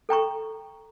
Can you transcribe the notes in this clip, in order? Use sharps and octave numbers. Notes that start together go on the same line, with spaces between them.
A4 G5 A#5 C#6